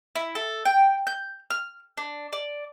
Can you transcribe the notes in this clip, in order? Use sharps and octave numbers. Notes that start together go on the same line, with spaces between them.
E4
A4
G5
G6
F6
D4
D5